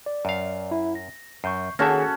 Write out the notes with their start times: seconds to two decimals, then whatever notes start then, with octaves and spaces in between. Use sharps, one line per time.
0.06 D5
0.25 F#2 F5
0.71 E4
0.95 A#6
1.44 F#2 C#6 G6 C7
1.79 D#3 A#3 C#4 F#4 G#4 A4 E5